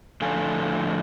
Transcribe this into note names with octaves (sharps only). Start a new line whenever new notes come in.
A2 D3 F3 A4 F5 G#5